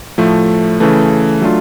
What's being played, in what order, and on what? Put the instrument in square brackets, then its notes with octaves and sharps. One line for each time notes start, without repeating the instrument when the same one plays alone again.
[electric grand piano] A2 F3 A3
C#3 E3 A3
F#3 A3 D4 F4